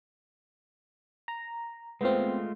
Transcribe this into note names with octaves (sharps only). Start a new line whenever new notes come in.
A#5
G#3 A3 B3 C4 F4